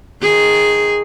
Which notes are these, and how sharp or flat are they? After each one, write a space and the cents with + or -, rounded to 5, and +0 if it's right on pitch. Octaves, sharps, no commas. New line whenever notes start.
D#3 +0 G#4 +0